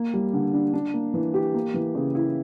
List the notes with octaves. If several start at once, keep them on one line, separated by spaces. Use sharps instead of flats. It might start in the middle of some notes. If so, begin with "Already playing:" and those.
Already playing: A#3
G3
D3
D4
D4
A#3
E3
G4
A#3
E3
C#3
E4